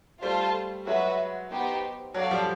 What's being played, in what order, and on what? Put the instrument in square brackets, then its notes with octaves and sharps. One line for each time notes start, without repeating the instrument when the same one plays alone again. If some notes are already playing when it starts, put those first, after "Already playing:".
[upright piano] G3 A3 [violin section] F4 A4 C5 F5 A5
[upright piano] F#3 G#3 [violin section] F#4 B4 E5
[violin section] B3 D#4 G4 C5
[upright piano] F#3 [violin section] F#4 A4 D5 F5
[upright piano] F3 G3